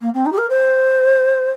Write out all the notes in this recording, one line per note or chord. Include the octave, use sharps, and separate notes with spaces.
A#3
C4
D#4
G4
A#4
C5